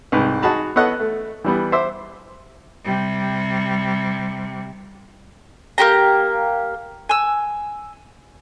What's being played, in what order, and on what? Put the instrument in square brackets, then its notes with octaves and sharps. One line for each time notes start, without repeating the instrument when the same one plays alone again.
[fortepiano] C2 G#2 B4
D#4 F#4 G#4 A5 B5
B3 A4 C#5 D#5 F#5
A3
E3 G3 B3
C5 E5 D6
[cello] C3 G3
[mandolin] A#3 B3 G4 A#5
G#5 E6